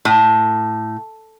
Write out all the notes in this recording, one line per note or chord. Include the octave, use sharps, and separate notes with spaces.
A2